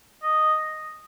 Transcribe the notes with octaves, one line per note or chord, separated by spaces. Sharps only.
D#5